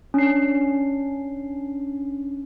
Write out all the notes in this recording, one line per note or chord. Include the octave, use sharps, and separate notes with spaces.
C#4 D4 C7